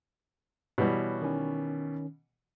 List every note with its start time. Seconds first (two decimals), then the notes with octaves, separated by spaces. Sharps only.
0.78 B2 E3 G3 C#5
1.22 D#3 C#4